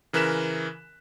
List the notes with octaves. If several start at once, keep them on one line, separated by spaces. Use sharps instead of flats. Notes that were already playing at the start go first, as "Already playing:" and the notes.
C#3 E3 A#4 F#6 B6 E7